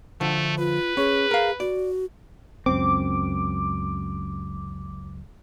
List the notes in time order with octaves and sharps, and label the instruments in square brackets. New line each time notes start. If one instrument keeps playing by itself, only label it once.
[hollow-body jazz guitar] D3 F3 [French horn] A3
[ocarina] F4 [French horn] B4
[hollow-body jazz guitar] C#4 [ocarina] G#4
[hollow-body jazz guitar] A#4 F5
[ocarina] F#4 [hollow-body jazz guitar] D5
[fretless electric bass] C#2 F#2 C4 [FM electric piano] D6